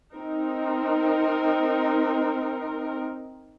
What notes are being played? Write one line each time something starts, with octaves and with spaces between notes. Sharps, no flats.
C4 D#4 A#4